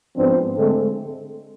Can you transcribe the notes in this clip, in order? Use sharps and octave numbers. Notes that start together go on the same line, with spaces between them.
G#2 F3 B3 C4 D4 C5
D3 G#3 A3 C4 A4